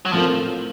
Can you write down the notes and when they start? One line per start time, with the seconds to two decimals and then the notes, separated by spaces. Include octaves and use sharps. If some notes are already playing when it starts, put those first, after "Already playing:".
0.05 F#3
0.13 A2 F3 A3 C4 F4 A#4